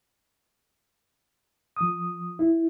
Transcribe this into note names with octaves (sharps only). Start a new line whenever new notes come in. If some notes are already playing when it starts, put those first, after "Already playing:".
F3 D#6
E4